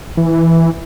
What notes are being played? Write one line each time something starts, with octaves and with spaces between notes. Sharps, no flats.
E3